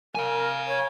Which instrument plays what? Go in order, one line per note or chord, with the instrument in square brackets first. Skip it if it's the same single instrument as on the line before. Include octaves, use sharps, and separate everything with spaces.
[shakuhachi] A#4 [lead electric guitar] F5 G#5
[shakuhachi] C#5